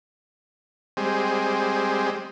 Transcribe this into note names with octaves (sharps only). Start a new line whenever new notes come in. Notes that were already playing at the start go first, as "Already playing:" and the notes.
G3 G#3 C4